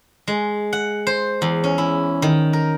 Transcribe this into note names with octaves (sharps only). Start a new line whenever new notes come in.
G#3
F#5
C5
E2
C#4
E4
D#3
A#4